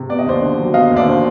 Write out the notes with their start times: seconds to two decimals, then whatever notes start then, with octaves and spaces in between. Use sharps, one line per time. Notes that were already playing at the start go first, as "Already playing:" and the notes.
Already playing: C3
0.09 B3 D5
0.19 D#5
0.26 D#2 C5 D5
0.42 D3
0.58 F#3
0.74 B3 D#5 F5
0.91 D#2
0.96 D5 E5
1.06 D3 C5